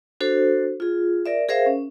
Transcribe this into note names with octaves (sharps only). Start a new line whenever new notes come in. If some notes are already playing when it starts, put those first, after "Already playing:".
D4 F#4 A4 C5
F4 G#4
A#4 D5 E5
G#4 A#4 C5 E5 F5
C#4